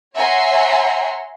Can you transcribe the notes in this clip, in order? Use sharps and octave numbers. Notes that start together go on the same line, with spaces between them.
C#5 E5 F#5 G#5 A#5 C6